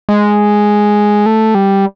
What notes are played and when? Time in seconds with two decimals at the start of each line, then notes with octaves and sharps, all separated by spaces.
0.09 G#3
1.26 A3
1.55 G3